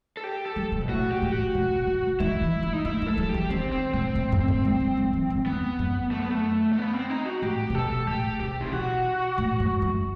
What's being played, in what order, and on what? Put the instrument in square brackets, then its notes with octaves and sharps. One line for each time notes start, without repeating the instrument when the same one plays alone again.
[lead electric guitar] A4
G4
A4
[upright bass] F#3
C3
B2
[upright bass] A2 [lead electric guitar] F#4
[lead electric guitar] G4
[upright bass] A2
[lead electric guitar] F#4
[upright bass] B2
C3
[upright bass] D#3 [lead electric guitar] E4
[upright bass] E3
A3
[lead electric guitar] D#4
[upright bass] A3 [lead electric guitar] E4
[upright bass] A3
[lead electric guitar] A4
[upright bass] F#3
[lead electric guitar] G4
[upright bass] E3
[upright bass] D#3 [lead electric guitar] C4
[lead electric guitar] C4
[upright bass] B2 [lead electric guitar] C4
[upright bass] A2
F#2
A2
G3
G3
F#3
E3
F#2
[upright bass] E2 [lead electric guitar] B3
[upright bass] F#2
[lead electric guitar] A3
B3
A3
A3
B3
C4
D#4
F#4
[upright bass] A2 [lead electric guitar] G4
[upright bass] C3
[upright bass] B2 [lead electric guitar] A4
[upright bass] A2 [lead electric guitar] G4
[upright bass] C3 [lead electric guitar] G4
[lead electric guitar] E4
[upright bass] B2 [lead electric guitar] F#4
[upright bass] A2
G2
F#2